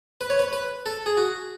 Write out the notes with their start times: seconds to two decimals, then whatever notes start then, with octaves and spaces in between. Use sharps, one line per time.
0.21 B4
0.30 C#5
0.39 B4
0.53 B4
0.86 A4
1.06 G#4
1.17 F#4